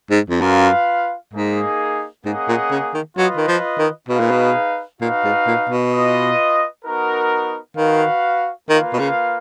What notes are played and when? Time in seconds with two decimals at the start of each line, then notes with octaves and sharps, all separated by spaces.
0.10 G#2
0.30 F2
0.41 F#2 F4 B4 F5
1.33 G#2 A#3 D#4 G#4
2.25 G#2 A#3 C#4 G#4 D#5 F#5
2.48 A#2
2.71 C#3
2.94 D#3
3.17 F#3 F4 B4 D#5
3.37 D#3
3.48 F3
3.78 D#3
4.09 B2 D#4 G#4 B4 F5
4.20 A#2
4.31 B2
5.01 A#2 D#4 F#4 B4 F5
5.25 G#2
5.47 A#2
5.70 B2
5.93 F4 B4 D#5
6.85 B3 D#4 F#4 A#4
7.77 D#3 F#4 B4 F5
8.68 D#3 A#3 F4 B4 F5
8.93 B2
8.99 C#3